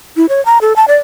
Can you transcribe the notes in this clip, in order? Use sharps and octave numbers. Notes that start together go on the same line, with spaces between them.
E4
C#5
A#5
A4
A5
D5